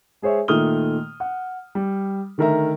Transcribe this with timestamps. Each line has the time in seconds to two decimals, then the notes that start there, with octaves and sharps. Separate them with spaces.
0.22 G#3 G#4 C5 C#5 E5
0.48 A#2 D#3 A3 D#6 F6 G7
1.20 F#5
1.75 G3
2.38 D3 D#3 A3 A#4 E5 A#5